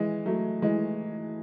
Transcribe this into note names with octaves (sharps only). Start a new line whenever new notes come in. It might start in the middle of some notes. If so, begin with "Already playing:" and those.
Already playing: E3 G#3
F#3 A3
E3 G#3